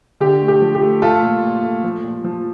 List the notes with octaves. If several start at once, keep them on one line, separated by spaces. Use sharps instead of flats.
D3 G4
A3
G4
F3
G4
A3
A3 F4 A4
A#2
A#2
A3
F3
A#2
F3